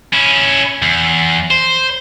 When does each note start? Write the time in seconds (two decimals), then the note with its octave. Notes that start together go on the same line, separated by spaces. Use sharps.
0.13 C#4 E4
0.82 E2
1.51 C5